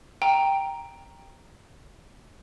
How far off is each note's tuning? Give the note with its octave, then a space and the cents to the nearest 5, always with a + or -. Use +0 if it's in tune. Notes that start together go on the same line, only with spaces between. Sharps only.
G5 +0 A#5 +0